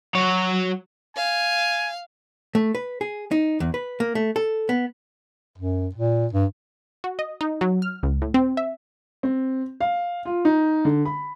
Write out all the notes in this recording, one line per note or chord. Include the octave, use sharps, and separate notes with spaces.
F#3 C#5
F5 G#5
A3
B4
G#4
D#4
E2
B4
A#3
A3
A4
B3
F#2
A#2
G2
F#4
D#5
D#4
F#3
F6
C#2
A2
C4
E5
C4
F5
F4
D#4
D3
B5